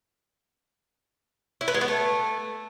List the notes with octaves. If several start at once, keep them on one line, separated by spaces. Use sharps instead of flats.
E4
B4
G#3
B3
A3